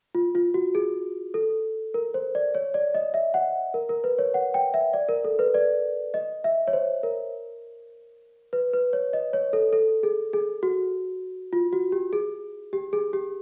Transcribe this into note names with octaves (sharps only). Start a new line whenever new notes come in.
F4
F4
F#4
G#4
A4
A#4
C5
D5
C#5
D5
D#5
E5
F#5
A#4
A#4
B4
C#5
F#5
G5
E5
D5
A#4
A4
B4
D5
D#5
E5
C#5
C5
A#4
B4
B4
C#5
D#5
C#5
A4
A4
G#4
G#4
F#4
F4
F#4
G4
G#4
G4
G#4
G4